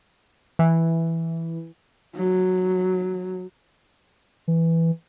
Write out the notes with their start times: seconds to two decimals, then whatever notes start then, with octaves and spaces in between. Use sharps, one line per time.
0.59 E3
2.15 F#3
4.48 E3